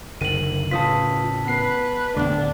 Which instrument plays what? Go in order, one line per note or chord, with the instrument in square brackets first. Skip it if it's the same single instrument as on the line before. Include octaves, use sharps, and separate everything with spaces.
[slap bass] F#1 D3 D#3 [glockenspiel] D#7 F#7
[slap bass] A2 C#3 [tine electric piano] F4 B4 D#6 [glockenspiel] A5 B6
[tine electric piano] B3 C7 [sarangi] B4
[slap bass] D1 G1 D2 [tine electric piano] D3 B3 [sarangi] D4